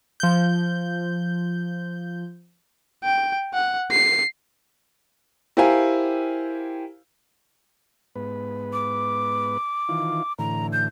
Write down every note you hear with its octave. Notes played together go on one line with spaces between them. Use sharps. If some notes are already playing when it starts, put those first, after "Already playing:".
F3 G6
G5
F#5
C7
E4 G4 A#4 C5 F5 G#5
G#2 B3 B4
D6
D#3 E3 F4
A2 D3 E3 A#5
G6